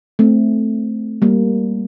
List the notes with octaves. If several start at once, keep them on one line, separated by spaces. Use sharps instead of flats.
A3 C4
G3 A#3